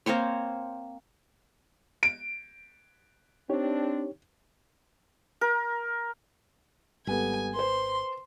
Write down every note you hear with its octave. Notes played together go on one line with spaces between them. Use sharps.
A#3 C4 C5 C#5
D7
C4 D4 D#4 G4 C#5
A#4
G#1 G3 B3 A4 G#5
B4 C5 C6